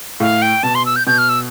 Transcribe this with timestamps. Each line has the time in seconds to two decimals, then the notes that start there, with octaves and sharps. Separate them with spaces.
0.20 A2 F5
0.42 G5
0.63 B2 A5
0.75 C6
0.86 E6
0.96 G6
1.07 B2 G6
1.18 F6
1.29 E6